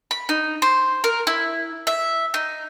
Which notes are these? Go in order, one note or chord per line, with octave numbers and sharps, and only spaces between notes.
B5
D#4
C5
A#4
E4
E5
D#4